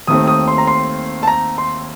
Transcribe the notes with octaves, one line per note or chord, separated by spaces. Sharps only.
D#2 D#3 A3 C4 D#6
D#6
C6
A#5
C6
A5
A#5
C6